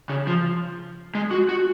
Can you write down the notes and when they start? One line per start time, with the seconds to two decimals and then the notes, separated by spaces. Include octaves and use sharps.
0.09 C#3
0.27 F3
1.15 G#3
1.31 F#4
1.49 F#4